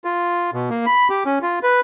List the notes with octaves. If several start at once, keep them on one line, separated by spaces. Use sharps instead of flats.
F4
B2
A#3
B5
G4
C#4
F4
B4